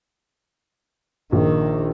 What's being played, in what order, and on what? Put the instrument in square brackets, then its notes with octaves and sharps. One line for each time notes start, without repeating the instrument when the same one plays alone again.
[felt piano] A#1 [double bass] D#3